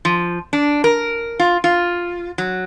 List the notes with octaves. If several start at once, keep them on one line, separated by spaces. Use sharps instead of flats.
F3
D4
A#4
F4
F4
F#3